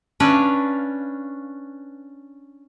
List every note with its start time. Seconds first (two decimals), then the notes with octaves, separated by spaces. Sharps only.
0.20 C#4 D4 B4 E5 F5